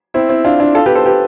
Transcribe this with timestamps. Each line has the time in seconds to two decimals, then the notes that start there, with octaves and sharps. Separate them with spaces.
0.14 C4 E4
0.29 C4 E4
0.44 D4 F4
0.59 D4 F4
0.75 F4 A4
0.86 G4 B4
0.96 A4 C5
1.06 G4 B4